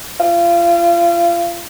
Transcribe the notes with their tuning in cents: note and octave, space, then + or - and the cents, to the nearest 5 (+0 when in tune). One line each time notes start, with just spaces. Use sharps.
F4 -30